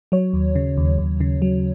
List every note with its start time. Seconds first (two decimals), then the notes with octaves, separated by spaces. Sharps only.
0.12 F#3 C#5
0.33 D#2
0.56 C#3
0.77 D#2
0.98 D#2
1.20 C#3
1.42 F#3